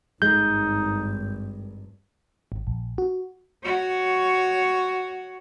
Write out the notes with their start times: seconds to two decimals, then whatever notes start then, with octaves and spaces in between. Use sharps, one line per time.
0.22 G#1 G2 G#3 D#4 G6
2.52 G#1
2.67 A#1
2.98 F#4
3.64 F#4 C#5